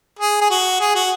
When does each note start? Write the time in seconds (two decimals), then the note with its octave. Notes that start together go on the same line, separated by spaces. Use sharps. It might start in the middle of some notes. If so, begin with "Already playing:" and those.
0.19 G#4
0.41 G#4
0.50 F#4
0.80 G#4
0.95 F#4